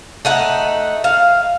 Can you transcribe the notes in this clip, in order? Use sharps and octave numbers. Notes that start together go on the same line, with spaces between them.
A3 D#4 F#5
F5